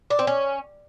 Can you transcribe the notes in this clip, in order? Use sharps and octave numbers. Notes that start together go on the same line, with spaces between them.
D4
C4
C#4